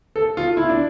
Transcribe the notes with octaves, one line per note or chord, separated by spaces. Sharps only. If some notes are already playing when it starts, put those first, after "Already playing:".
A4
F4
E4
D4